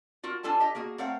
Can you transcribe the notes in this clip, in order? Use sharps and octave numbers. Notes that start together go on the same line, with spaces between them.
F4 F#4 A#4
D4 F4 A4 G#5 A5
G4 D#5
A#3 F#4 G#4
A3 C4 A#4 C#5 F5 F#5